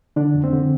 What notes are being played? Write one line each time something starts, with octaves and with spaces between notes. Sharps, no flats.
D3 D4
F2
C4
D3